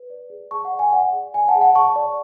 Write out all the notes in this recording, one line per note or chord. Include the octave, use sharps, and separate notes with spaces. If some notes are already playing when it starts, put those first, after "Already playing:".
Already playing: B4
D5
G#4
G#4 A5 C#6
F#5
D5
G#5
D5 F#5
G#4
D5 G#5
F#5 A5
G#4
F#5 A5
G#4 A5 C#6
D5